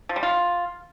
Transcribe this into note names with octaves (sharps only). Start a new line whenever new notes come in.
F3
G3
F4